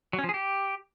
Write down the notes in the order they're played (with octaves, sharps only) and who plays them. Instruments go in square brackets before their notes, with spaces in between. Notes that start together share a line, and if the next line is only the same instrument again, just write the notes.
[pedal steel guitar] F#3
C#4
F3
G#4
G4